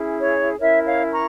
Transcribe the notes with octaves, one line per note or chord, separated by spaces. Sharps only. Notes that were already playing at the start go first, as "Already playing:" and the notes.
Already playing: C#4 E4 G#4
C#5
C#4 E4 A#4 C#5 E5
C#5 F5
A#5 C#6